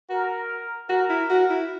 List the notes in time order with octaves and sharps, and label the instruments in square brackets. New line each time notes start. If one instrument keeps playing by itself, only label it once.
[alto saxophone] F#4 [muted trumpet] A#4
[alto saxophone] F#4 [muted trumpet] A#4
[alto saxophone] E4
F#4
E4